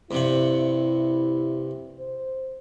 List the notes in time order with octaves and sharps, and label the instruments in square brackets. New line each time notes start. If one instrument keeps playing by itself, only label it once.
[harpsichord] G2 C3 F#5 [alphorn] E4
[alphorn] C5